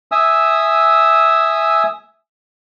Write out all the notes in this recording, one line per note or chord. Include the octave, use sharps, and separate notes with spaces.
E5 G#5 D#6 E6